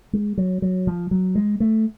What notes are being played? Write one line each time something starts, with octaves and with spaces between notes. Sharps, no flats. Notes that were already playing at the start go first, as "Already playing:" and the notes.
G#3
F#3
F#3
F3
F#3
G#3
A3